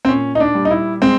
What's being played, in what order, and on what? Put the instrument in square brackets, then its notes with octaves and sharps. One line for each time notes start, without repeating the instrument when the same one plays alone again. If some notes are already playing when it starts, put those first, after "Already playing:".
[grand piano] C4
A#2 C#4
D#4
D4
G3
D#4
E4
G#3 C4